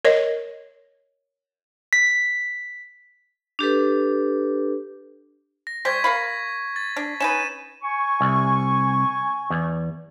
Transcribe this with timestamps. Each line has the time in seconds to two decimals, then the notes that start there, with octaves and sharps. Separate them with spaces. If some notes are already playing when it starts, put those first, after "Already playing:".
0.05 A#4 C#5 D#5
1.93 B6
3.59 D4 G4 A4 B4
5.67 A#6
5.85 G3 G4 C5 C#6 G#6 B6
6.04 A#4 F5 B5
6.76 A6
6.96 D4
7.20 C#4 D#4 B4 D#7 E7
7.82 G#5 C#6
8.21 C2
9.50 E2